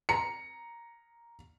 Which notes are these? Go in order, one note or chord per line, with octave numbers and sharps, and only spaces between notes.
A#5 C#7